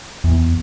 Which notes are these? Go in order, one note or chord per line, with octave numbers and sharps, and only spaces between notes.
E2